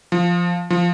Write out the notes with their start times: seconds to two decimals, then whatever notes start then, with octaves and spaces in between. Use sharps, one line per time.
0.12 F3
0.70 F3